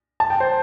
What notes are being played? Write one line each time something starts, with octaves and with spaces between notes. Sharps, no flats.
A5
G5
C5